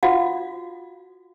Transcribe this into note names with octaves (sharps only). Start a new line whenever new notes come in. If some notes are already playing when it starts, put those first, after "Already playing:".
F4 F#4 F5 F#5